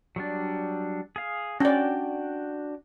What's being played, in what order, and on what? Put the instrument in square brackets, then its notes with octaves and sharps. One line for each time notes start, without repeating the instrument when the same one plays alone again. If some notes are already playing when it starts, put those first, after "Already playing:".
[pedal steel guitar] F#3 G3 D4
G#4 F5
[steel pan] C#4 D5 [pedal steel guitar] D4 F#4 G5